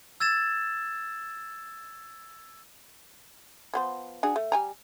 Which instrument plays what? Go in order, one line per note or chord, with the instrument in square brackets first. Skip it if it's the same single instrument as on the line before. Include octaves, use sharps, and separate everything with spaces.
[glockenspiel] E6 G#6 A6 E7
[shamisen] F3 B3 C5
D4 F#4 G#4
A3
G3 G#5 A#5